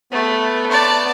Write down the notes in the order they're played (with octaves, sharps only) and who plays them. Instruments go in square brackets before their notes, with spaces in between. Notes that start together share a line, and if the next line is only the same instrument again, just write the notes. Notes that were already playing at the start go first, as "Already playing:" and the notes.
[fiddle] A3 [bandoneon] B3
[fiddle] D5 A5